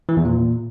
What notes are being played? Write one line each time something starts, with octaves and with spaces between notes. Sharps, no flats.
E3
E2
A#2